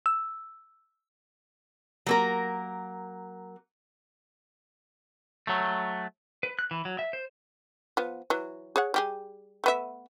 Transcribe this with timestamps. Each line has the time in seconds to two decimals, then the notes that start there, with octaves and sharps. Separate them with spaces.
0.06 E6
2.06 F#3 A#3 A#4
5.47 F#3 A3
6.43 B4
6.59 F#6
6.71 E3
6.85 F#3
6.99 E5
7.13 C5
7.97 F3 B3
8.30 E3 F#3
8.76 G#4 C#5 F#5
8.94 G3 G4 G#4
9.64 A3 B3 E5